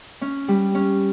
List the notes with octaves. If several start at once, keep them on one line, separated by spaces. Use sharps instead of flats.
C#4
G3
C#4